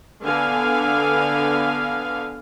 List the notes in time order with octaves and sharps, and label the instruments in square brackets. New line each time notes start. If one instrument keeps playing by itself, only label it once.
[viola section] D3 B3 F5 G#5